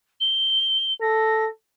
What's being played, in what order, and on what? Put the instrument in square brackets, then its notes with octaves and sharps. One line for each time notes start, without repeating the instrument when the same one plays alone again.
[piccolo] G7
[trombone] A4 [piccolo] A#6